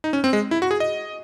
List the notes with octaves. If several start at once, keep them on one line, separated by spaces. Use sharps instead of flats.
D#4
C#4
C4
G#3
E4
F#4
G#4
D#5